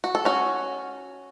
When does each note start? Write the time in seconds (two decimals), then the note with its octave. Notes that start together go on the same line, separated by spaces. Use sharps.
0.04 F#4
0.15 A4
0.25 C#4 F#4